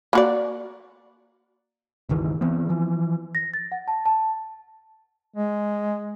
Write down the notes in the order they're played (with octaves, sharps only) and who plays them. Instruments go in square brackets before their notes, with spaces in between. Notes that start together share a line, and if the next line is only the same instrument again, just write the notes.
[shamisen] A#3 F#4 D5
[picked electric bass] G1 C#2 D#3 E3
E3 B3 C4
E3 F3
[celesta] A#6
A6
F#5
A5
A5
[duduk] G#3